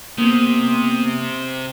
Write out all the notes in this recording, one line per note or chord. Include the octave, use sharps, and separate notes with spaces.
C3 A#3 B3 D#6